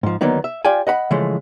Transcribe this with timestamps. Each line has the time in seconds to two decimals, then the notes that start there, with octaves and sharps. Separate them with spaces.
0.03 G#2 F3
0.21 D2 D#3 F#3 A#3 B3 D#4
0.44 E5
0.65 F4 G4 D5 F5 G5 G#5
0.87 D#5 F#5 B5
1.11 C#3 E3 F3 G#3 A3